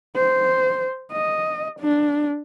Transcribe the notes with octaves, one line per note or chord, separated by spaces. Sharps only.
C5
D#5
D4